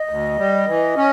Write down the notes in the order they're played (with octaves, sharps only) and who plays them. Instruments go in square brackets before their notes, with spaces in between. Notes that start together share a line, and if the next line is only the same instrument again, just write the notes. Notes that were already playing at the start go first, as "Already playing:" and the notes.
Already playing: [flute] D#5
[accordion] D2
G3
E3
C#4